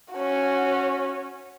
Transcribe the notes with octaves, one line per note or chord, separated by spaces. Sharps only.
C#4 F#4